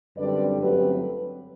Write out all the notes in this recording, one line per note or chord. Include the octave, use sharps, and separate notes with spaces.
F#2 D3 G3 C4 B4 D5
G1 F#2 F#3 A3 C4 G4 B4